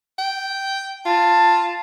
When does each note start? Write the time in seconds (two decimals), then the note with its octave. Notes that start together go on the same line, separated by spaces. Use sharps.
0.19 G5
1.06 F4 A5